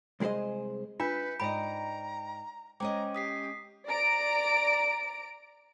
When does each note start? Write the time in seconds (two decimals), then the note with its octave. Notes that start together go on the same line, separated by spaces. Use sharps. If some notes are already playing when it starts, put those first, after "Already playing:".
0.20 C2 G#3 G#4 C5 D#5
1.00 D4 F4 B4 E5 G6 B6 C#7
1.40 G#2 D5 D#5 G5 A#5 B5 D7
2.80 G#3 C#4 C5 D#5 G5 A#5 D6
3.15 G4 D#6 B6 C7
3.88 D5 A#5 D7